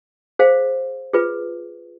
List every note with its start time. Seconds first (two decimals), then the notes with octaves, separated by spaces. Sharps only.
0.39 G#4 C5 F5
1.13 F4 G#4 B4